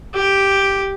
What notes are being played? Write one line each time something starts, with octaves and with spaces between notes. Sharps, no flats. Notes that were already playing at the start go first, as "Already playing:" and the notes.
G4